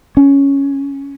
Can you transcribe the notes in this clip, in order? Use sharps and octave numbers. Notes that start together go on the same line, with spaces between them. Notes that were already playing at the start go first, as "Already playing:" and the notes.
C#4